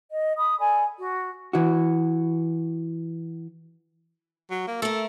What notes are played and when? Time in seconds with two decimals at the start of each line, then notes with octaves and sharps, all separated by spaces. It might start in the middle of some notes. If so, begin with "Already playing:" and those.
0.11 D#5
0.37 B5 D#6
0.60 A4 D5 G#5 B5
0.98 F#4
1.53 E3 F#4
4.50 F#3
4.67 A#3
4.82 A3 A4 A#4